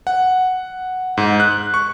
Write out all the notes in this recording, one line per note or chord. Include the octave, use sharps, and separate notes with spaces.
F#5
G#2
F#6
C#6